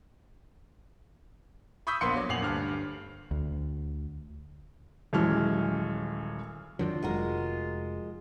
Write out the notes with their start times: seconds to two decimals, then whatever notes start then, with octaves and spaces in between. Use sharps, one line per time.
1.87 B5 C#6 D#6 E6 G6 B6
2.01 A#1 A#3 B3 C6 C#7
2.16 F#3 D6
2.29 F#2 A#2 F#5 C7 F7 F#7
2.42 D2 G2 F6
3.31 D2
5.13 D#1 F#2 E3 G#3 F6
6.79 F#2 D#3 F#3 D4 F4
7.03 F1 G#3 F#4 A#4